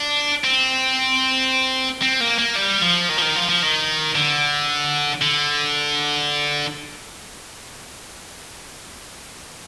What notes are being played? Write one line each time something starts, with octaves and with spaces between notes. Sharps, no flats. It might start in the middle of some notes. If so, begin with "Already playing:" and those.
Already playing: D4
C4
C4
A#3
A#3
G3
F3
D#3
F3
D#3
F3
F3
D#3
D3
D3